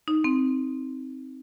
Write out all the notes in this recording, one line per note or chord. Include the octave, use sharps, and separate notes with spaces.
D#4
C4